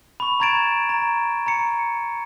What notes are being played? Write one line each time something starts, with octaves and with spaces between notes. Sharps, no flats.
B5 C#6
A#5 B5 G#6 A6 D7 E7
A#5
A#5 C#7